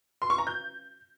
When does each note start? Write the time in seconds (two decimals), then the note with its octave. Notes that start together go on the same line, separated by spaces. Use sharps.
0.22 C6
0.30 C#6
0.38 A#5
0.47 G6